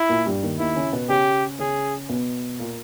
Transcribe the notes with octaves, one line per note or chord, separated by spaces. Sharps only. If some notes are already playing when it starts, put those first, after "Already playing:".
Already playing: E4
A#2 A#3
G2 G3
D#2 D#3
D#2 D#3 E4
C#3 C#4
B2 B3
C#3 C#4 G4
C#3 C#4 G#4
B2 B3
A#2 A#3